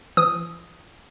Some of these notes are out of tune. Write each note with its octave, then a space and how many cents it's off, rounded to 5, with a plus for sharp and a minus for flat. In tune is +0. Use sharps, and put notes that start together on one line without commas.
E3 +45 D#6 +0